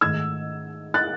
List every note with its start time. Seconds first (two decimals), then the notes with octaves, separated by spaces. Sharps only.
0.01 G#2 D#3 A3 E6 G#6
0.94 F#6 A6